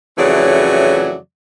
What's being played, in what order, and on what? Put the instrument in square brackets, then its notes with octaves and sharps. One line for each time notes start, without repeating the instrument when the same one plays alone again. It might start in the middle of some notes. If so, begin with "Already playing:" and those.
[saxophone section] F2 C#3 E3 F#3 A3 D5